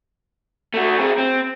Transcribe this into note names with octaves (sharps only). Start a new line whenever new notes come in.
A3 F#4
C4 G#4
C4